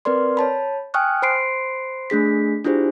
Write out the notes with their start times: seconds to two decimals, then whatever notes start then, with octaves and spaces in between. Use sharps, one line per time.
0.05 C4 A#4 B4 D5 C6
0.37 C#5 A5 B5
0.94 G5 G#5 C#6 D#6 F6 F#6
1.22 C5 B5 C6 C7 D7
2.10 A3 D4 G#4 B6
2.64 D4 E4 F4 G4 G#4 C5